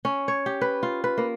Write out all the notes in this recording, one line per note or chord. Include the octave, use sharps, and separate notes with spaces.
C#4
C#5
G4
B4
F4
B4
A#3